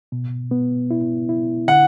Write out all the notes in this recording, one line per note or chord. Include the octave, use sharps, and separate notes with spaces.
B2
B3
E4
E4
D3 F#5